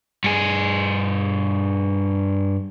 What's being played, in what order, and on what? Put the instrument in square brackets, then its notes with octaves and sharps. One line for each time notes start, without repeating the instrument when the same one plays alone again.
[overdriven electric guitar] G2 G#4